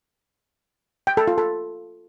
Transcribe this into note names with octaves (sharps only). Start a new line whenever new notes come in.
G5
A4
F4
A4